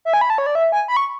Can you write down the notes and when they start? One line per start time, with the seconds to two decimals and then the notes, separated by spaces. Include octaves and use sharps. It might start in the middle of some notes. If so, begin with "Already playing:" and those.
0.05 E5
0.14 G#5
0.21 B5
0.30 A5
0.38 C#5
0.46 D5
0.55 E5
0.72 G#5
0.88 B5
0.97 C#6